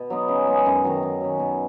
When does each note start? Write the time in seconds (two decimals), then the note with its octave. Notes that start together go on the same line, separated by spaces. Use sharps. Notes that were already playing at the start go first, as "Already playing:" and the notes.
Already playing: B2
0.10 F#3 B3 D#4
0.28 C#3
0.47 G#3 B3
0.66 F#2
0.84 D#3 F#3
1.03 D#3
1.21 F#3 C#4
1.39 B2